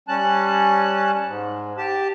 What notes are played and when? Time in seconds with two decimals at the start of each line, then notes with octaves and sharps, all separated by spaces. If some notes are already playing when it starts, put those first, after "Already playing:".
0.08 G3 C#4 A5 F#6
1.26 G#2
1.78 G4 A5